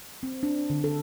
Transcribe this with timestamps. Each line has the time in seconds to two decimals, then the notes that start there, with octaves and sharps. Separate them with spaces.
0.23 C4
0.43 D4
0.70 D3
0.84 A4